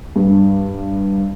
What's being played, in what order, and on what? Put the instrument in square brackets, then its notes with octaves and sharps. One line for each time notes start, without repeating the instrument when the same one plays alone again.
[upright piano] G2